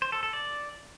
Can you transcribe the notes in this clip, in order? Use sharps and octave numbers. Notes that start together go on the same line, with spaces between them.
C5
A4
A4
D5